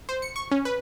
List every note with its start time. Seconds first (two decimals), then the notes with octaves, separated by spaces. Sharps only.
0.09 C5
0.22 C#7
0.36 C#6
0.51 C#4
0.65 B4